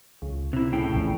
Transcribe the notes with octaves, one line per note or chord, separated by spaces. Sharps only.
C#2
C3 E4
A2 C#3 G5
A#1 E2